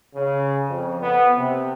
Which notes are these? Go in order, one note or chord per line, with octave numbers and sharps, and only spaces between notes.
C#3
F2
B3
C3